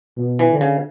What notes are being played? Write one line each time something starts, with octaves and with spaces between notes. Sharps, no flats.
B2
E3
D3
C#3